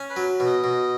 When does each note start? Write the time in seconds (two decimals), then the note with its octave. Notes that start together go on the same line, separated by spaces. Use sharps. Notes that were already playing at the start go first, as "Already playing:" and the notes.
Already playing: C#4
0.10 B4
0.17 F#3
0.40 B2
0.47 D#5
0.64 B2